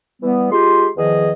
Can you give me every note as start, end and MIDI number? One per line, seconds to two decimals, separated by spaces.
0.22 0.48 52
0.22 0.48 55
0.22 0.48 59
0.52 0.87 56
0.52 0.87 65
0.52 0.87 67
0.52 0.87 84
0.97 1.31 40
0.97 1.31 51
0.97 1.31 53
0.97 1.31 68
0.97 1.31 75